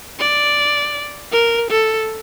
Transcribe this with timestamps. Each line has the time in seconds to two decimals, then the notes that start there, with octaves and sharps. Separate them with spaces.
0.19 D5
1.32 A#4
1.70 A4